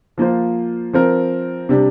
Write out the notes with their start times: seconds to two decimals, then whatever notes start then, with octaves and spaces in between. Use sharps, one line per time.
0.18 F3 A#3 F4 C5
0.93 F3 C4 A#4
1.69 C3 G3 D4